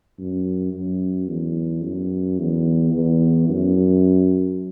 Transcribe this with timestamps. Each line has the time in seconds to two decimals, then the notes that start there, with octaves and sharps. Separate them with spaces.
0.19 F#2
0.74 F#2
1.29 E2
1.83 F#2
2.39 E2
2.93 E2
3.49 F#2